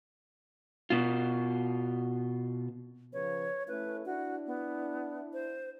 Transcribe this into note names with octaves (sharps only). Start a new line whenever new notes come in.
B2 F4
C#3 F3 B4 C#5
A3 C#4 E4 B4
D4 E4 F#4
B3
C5